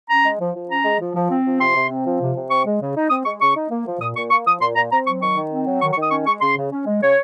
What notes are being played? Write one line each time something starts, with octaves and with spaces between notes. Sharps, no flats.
C#4 A#5
G#3
F3
F3
C#4 A#5
G#3
F3
F3
C4
F3
C3 C6
C3
C4
F3
C3
C3
C4 C#6
G#3
C#3
D#4
C4 D#6
G#3 C#6
C#3 C#6
D#4
A#3
F3
A#2 D#6
A#2 C#6
A#3 C#6
F3 D#6
A#2 C6
A#2 A#5
C4 A#5
F#3 C#6
D#3 C#6
D#3
C4
F#3
D#3 C#6
C#6
D#3
D#6
C#4 C#6
G#3 C#6
C#3 C6
C#3
C#4
G#3
C#3 C#5